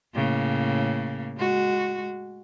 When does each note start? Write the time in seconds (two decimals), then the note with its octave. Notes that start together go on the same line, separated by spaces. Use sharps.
0.15 A2 C#3 A#3
1.38 G#3 F#4